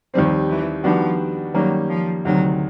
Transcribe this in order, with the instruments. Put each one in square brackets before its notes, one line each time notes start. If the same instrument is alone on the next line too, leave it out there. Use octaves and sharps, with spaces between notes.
[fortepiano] D#2 D#3 G3 C4 [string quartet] F3
[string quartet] E3
[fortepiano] D#3 G3 B3 D4 F#4 [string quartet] F3
[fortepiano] D#3 G3 A#3 C#4 [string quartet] F#3
[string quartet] F3
[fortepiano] D2 C3 D#3 [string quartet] F#3